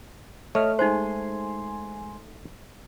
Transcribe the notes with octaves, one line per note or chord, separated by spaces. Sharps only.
A3 C#5 D#5 F6
G#3 D#4 C5 G#5 C6